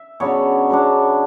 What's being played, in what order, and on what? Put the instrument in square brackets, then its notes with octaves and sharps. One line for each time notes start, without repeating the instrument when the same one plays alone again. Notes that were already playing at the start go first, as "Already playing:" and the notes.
Already playing: [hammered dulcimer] E5
C#3 F#3 B3 D4 C#5
C#3 F#3 B3 D4